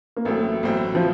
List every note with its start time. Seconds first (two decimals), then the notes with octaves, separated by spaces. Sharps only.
0.17 A#3
0.25 A1 A2 F#3 A3 C4
0.63 A1 A2 F#3 C4
0.95 F3